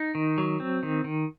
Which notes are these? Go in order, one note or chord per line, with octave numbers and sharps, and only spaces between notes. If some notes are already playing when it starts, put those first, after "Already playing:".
Already playing: D#4
D#3
F#3
C4
D#3
D#3